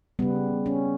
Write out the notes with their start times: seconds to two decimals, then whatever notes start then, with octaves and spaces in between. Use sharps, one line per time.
0.19 C#3 G3 B3
0.66 C#4